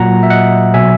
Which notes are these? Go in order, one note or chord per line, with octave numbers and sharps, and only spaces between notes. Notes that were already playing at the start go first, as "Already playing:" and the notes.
Already playing: A#2 F#3 F#5 A#5
E5
D#5 F#5
B2 F#3 E5 G#5